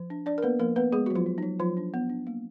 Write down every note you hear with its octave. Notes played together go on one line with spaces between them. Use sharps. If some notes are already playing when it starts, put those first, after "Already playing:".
Already playing: F3
D4
D4 D5
A#4
A#3 B3 B4
F3 A#3 A#4
A#3 B3 B4
G#3 B3 G#4
F#3 F#4
F3 F4
F#3
F#3 D#4
F3 F#3 F4
D4
B3
D4
A#3